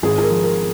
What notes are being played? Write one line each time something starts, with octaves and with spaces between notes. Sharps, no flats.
G#1 G#4
G#4
A#4
F3
A#4